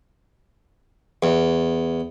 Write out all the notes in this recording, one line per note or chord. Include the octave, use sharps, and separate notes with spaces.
E2